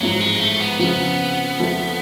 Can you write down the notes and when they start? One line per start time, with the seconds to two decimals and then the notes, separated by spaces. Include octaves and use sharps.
0.01 A1 G#2 F3 F#3
0.21 G#3
0.40 A3
0.60 B3
0.79 F2 C#3 F3 B3
1.60 F2 F3 A3